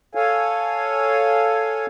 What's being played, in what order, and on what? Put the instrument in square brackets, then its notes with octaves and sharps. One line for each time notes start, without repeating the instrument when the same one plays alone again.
[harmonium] A4 C#5 F5 G#5